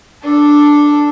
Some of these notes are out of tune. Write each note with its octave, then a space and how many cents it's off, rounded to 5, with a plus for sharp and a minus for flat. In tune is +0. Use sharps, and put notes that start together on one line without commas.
D4 +0 A4 -5